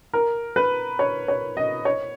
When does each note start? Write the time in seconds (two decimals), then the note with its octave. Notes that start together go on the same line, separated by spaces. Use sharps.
0.13 A#4
0.56 B4
0.99 C#5
1.28 C#5
1.57 D#5
1.85 C#5